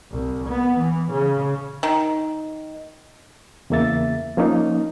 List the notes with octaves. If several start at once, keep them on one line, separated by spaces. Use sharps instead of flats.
C2
B3
E3
C#3
D#3
E2 C#3 A#3 E5 A6
F3 A#3 C#4 D#4